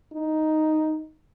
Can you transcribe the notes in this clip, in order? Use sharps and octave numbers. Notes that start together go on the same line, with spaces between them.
D#4